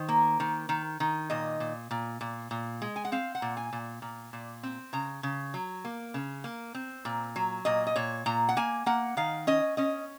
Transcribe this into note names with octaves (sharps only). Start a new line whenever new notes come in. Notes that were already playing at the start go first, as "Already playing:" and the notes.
Already playing: D#3 C5
A#3
D#3
D#3
D#3
A#2 D#5
A#2
A#2
A#2
A#2
G#3
G#5
F#5
C4 F5
F#5
A#2
G#5
A#2
A#2
A#2
C4
C#3 A#5
C#3
F#3
A#3
C#3
A#3
C4
A#2
F#3
A#2 D#5
D#5
A#2 C#5
A#2 A#5
F#5
A#3 G#5
A#3 F#5
D#3 F5
C#4 D#5
C#4 D#5